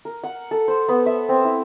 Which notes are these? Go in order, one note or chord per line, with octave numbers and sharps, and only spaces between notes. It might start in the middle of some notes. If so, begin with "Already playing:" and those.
A#4
F#5
A4
C5
B3
E5
C4
E4